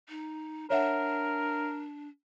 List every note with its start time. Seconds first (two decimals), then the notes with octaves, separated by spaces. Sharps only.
0.09 D#4
0.70 D4 A#4 C#5 E5 F#5